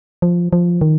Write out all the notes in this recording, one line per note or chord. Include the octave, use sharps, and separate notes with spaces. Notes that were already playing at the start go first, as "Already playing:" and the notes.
F3
F3
D#3